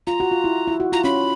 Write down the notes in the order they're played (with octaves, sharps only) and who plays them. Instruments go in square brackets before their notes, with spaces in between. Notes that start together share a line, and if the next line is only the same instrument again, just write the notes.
[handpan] F4 [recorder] A#5
[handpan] F#4
F4
E4
E4
F#4
[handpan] F4 [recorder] A#5
[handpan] C#4 [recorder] B5